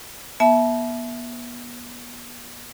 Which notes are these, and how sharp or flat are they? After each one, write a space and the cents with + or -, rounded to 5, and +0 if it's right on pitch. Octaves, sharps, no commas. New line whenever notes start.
B3 -35 E5 +0 A5 -30